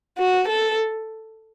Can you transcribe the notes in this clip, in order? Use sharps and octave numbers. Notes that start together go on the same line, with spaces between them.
F#4
A4